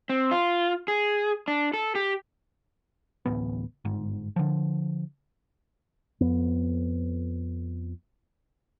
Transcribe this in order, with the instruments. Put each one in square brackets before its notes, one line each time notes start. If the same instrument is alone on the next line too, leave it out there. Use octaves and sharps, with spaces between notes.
[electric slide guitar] C4
F4
G#4
D4
A4
G4
[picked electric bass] D1 A1 B3
G1 G#2
D3 F3
[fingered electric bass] F2 B3